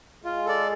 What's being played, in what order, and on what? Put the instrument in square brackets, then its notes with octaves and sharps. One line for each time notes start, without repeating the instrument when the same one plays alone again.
[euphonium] G#3 [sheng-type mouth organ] F4
[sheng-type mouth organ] A4 D5